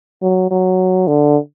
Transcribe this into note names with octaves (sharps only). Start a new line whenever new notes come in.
F#3
F#3
D3